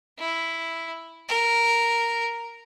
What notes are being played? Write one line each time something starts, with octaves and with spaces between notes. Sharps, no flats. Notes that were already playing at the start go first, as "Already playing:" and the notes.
E4
A#4